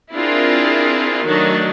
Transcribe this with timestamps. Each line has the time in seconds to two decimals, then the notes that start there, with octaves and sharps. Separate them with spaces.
0.14 C4 D4 E4 F4 G#4 A#4
1.26 D#3 F#3 A3 D4 D#4